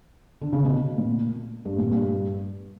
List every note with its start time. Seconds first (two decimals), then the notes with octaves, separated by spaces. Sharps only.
0.41 D3
0.53 C#3
0.64 B2
0.98 A#2
1.65 G2
1.78 A#2
1.91 G2